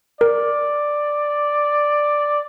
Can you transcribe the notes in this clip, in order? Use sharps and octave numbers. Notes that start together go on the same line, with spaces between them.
A#4 D5